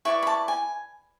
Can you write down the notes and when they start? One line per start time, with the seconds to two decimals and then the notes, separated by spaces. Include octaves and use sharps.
0.05 E4 B4 D5 C#6
0.23 B5
0.27 A5
0.48 G#5